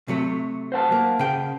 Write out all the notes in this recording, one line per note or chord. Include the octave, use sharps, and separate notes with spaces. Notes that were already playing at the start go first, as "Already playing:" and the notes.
C3 F#3 A3
C5 F#5 A5
A#3
C#3 G5